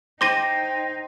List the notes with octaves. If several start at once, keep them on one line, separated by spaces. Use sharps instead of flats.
D#4 C5 G5 D6 A#6 D#7